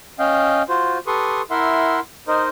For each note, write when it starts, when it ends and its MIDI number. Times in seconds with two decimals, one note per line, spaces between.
0.19 0.62 61
0.19 0.62 75
0.19 0.62 77
0.19 0.62 79
0.69 0.98 65
0.69 0.98 66
0.69 0.98 72
1.07 1.42 67
1.07 1.42 69
1.07 1.42 71
1.07 1.42 84
1.07 1.42 85
1.07 1.42 87
1.50 2.00 64
1.50 2.00 70
1.50 2.00 76
1.50 2.00 78
1.50 2.00 84
2.28 2.49 63
2.28 2.49 70
2.28 2.49 72
2.28 2.49 75